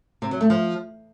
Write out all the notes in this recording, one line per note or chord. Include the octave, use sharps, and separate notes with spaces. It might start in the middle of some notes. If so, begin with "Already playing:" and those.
C3
F#3
A3
F3